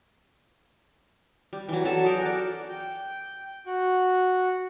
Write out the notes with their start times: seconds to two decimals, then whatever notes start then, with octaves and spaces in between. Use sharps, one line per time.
1.53 G3
1.69 E3 F#3
1.85 F#3 A4 A5
2.04 G#4 A#4 G5
2.21 F#4 D5
2.69 G5
3.66 F#4